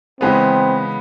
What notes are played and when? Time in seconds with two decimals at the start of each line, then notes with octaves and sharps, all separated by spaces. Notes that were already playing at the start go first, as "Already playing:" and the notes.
0.21 C#3 E3 G#3 B3 C4